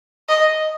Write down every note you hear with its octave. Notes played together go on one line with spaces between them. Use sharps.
D#5